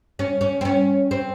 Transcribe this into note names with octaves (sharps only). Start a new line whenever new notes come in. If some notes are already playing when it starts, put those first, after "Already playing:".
C#4
C#4
C4
C#4
C4